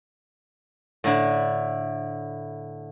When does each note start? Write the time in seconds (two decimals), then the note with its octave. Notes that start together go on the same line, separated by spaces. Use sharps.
1.04 A2 D3 E4